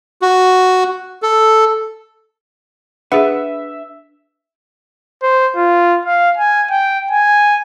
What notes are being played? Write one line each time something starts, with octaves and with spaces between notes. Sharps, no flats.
F#4
A4
D4 G#4 B4 E5 F#5
C5
F4
F5
G#5
G5
G#5